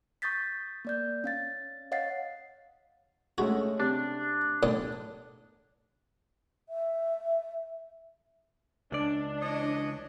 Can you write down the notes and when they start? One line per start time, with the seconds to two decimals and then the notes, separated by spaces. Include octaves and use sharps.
0.22 C#6 D#6 G6 A6 B6
0.85 A#3 D5 G6
1.24 C#4 F5 A6
1.92 C#5 D#5 F5 F#5 A6 C7
3.38 G#3 A3 C#4 F#4
3.80 C3 D4
4.63 D#2 A2 D#6
6.69 E5
8.92 C#2 D4 D5
9.41 E3 C#5 D#5